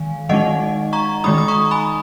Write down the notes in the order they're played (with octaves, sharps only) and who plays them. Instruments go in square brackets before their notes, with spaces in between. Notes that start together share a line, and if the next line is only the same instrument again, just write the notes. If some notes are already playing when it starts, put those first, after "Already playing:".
Already playing: [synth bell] D#3 G#3 F5 G#5
D#3 G#3 D#4 D#5 F#5
A#5 C#6
D#3 G#3 D#4 B5 D#6
D#6
A#5 C#6
G#5 B5